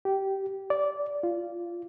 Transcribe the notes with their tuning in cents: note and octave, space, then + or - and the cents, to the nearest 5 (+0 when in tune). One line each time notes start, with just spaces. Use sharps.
G4 -15
D5 -15
F4 -15